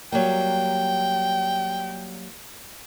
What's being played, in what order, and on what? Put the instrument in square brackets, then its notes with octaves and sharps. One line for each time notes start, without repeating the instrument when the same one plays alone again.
[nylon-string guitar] F#3 G3 A#3 [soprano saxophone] G5